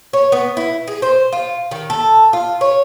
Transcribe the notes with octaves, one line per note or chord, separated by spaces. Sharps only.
C#5
B3
E4
G#4
C5
F4
D#3
A4
F4
C#5